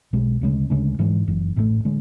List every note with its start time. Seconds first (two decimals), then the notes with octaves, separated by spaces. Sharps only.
0.13 B1 B2 G#3
0.41 D2 C#3 G#3
0.70 D2 C#3 G#3 D4
0.99 G#2 E3 G#3
1.27 F#1 F#2 E3
1.56 A1 A2 E3 A3
1.85 D3 G#3